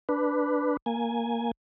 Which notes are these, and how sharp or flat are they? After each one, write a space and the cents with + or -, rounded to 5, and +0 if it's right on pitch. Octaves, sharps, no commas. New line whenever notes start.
D4 +0 B4 +0
A#3 +0 G#5 +0